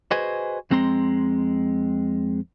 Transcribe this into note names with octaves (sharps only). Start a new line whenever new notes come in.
F#4 G#4 B4 C5 D#5 G#5
F2 G#3 C4 A#5 C6